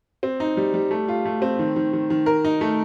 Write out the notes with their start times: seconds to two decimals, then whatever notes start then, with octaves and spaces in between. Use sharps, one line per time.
0.23 C4
0.40 D#4
0.57 G3
0.74 G3
0.91 A3
1.08 F4
1.25 A3
1.42 C4
1.59 D#3
1.76 D#3
1.93 D#3
2.10 D#3
2.26 A#4
2.45 D#4
2.61 A3